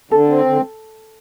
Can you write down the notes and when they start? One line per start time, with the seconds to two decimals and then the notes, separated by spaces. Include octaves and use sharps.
0.11 D3 A4
0.28 C4
0.45 D3